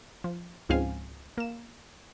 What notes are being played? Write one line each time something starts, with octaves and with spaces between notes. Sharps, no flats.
F3
C#2 G#2 F3 C4 F5 G#5
A#3 E7